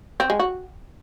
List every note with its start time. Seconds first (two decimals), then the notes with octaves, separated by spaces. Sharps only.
0.20 C4
0.30 G#3
0.40 F#4